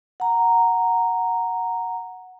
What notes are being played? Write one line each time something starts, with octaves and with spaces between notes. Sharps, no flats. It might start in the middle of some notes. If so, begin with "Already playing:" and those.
F#5 A#5